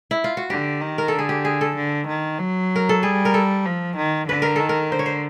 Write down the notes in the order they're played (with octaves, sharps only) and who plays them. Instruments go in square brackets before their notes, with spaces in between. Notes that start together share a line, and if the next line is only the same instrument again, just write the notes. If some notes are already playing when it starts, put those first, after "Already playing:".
[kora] E4
F4
F#4
[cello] D3 [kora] G4
[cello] D#3
[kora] A#4
[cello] D3 [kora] A4
[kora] G#4
G4
G#4
A4
[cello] D3
D#3
F#3
[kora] A#4
A4
[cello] G3 [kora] G#4
[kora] A#4
A4
[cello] F3
D#3
[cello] D3 [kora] B4
[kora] A#4
[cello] D#3 [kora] A4
[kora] A#4
[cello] D3 [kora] C5
[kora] C#5
C5